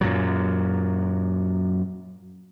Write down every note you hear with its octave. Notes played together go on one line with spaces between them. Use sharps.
F#2 A#2 F#3